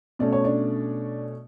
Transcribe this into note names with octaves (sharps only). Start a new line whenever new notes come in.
B2 A3 C#4 D5
C#5
D4 D5